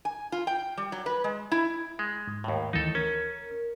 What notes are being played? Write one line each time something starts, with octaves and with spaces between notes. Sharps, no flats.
G#5
F4
G5
G3
F#3
B4
G#3
E4
G#3
G#2
D#2 A2
D2 D#3 E3 D#4 A4
C#4 A#4